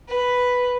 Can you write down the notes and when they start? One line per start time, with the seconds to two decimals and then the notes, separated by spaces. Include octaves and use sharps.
0.08 B4